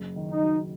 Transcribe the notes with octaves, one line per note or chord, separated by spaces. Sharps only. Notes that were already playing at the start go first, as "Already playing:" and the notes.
Already playing: F#1
D#3
D#4
F#3